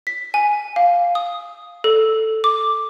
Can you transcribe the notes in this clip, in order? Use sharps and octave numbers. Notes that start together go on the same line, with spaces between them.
B6
G#5
F5
D#6
A4
D6